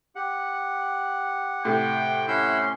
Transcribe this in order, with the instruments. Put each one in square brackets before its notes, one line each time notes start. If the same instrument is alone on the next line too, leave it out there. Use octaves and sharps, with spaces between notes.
[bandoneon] G4 [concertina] F#5
[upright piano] A2 C3 [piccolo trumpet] G5
[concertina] C#4 C6 [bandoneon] E4 E6 G6 [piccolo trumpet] F#5